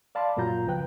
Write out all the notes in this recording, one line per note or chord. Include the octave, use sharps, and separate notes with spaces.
D5 F5 A5 B5 C6 D6
F#2 A#2 F#3 F4 A#5 G6
C#2 C#3 F3 B4 G5 F#6